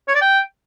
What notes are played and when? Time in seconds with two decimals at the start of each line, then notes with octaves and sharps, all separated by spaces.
0.08 C#5
0.15 D5
0.21 G5